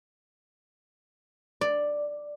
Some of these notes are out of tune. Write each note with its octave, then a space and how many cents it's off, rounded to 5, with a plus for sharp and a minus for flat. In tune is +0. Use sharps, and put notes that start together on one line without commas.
D5 +5